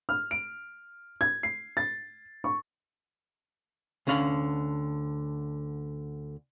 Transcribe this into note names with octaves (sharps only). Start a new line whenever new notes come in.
F6
D7
G#6
C7
A6
C#6
D2 D3 C#4 F5 B5